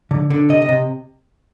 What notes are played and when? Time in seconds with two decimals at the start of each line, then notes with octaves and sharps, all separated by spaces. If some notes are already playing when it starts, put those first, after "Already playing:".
0.11 D3
0.30 D3
0.49 C3 D#5
0.62 D#5
0.69 C3